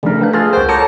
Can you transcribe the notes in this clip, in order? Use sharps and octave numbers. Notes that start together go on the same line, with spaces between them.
C#3 F3 G3 A3 D4 A#4
B4 F5 F#6
F4 G#4 A4 F5 F6 A6
C#2 F3 F#4 A#4 C5 G5
A4 C#5 A5 A#5 D6 G6 C#7